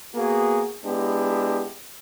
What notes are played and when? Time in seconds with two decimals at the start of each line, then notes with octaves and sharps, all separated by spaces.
0.15 A#3 B3 F#4 G#4
0.85 G#3 B3 D4 E4 G4